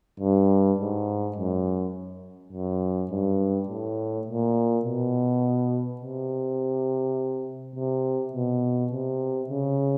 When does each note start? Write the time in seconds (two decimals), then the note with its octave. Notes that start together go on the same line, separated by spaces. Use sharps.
0.20 G2
0.79 G#2
1.36 F#2
2.53 F#2
3.10 G2
3.68 A2
4.27 A#2
4.85 B2
6.01 C3
7.76 C3
8.33 B2
8.92 C3
9.49 C#3